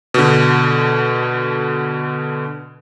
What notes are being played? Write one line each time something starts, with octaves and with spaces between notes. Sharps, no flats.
B2 D3